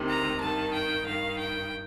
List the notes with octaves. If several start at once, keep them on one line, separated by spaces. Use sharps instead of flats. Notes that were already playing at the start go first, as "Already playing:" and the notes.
Already playing: D2 C3 D#3
A#5
G2 D#3 A5
G5
G2 D#3 F5
G5